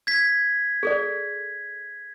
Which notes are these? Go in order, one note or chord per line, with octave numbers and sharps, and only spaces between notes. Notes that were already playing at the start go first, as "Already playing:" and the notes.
G#6 B6
G#4 A4 D5